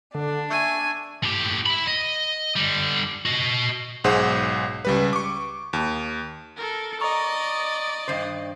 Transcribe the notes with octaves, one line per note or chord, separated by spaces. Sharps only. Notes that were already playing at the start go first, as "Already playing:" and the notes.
D3 D4
E5 G#5 C#6
A2 G4
E5 B5
D#5
D3 G3
F#4 D#5
B1 G#2 G#4 C5 F#5
C#2 G3 B4
C#6 D6
D#2
A4 A#4
D5 D#5 A#5 C#6
G2 D#3 C5